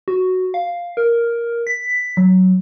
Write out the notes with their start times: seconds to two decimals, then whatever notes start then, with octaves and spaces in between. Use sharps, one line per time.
0.08 F#4
0.54 F5
0.97 A#4
1.67 B6
2.17 F#3